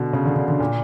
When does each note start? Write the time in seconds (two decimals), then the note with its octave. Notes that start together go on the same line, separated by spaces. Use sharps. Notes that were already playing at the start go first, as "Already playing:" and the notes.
Already playing: B2 D3
0.13 C#3
0.25 D3
0.36 D3
0.48 D3
0.60 A#2